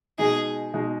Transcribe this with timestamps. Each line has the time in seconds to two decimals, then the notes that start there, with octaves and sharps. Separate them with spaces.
0.18 B2 G#3 D#4 G#4
0.74 B2 G#3 D#4